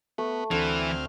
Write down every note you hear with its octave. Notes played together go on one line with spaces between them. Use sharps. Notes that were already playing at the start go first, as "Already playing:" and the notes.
A3 B3
D2 D3 E3 C4 F6